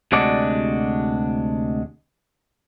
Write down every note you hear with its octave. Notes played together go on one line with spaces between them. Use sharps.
D2 C3 G#3 D4 F#4 D5